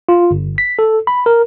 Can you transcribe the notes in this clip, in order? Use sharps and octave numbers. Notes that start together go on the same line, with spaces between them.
F4
G1
B6
A4
B5
A#4